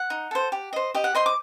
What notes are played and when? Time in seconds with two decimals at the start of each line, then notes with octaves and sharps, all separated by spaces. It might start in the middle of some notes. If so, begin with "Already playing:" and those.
Already playing: F#5
0.10 D#4
0.31 A4 C5
0.52 G4
0.73 C5 D#5
0.94 G4 D#5
1.04 F#5
1.15 C5 D#5 C6
1.26 D6